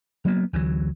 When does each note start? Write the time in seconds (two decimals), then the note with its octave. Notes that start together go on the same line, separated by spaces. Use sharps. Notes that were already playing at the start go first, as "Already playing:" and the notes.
0.25 F#3 A#3 B3
0.53 D2 E3 F#3